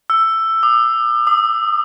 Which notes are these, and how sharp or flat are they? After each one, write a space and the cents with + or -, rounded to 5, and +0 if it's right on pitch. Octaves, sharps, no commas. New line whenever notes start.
E6 +10
D6 +45
D#6 -30